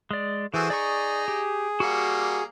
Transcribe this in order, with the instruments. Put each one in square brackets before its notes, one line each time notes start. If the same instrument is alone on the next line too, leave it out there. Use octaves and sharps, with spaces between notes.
[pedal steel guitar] G#3 D5
[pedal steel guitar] E3 [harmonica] F#4 A4 C5 [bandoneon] G#4
[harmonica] D#4 [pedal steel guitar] D5 C#6
[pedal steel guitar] G4
[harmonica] G3 A#3 [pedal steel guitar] F#4 F#5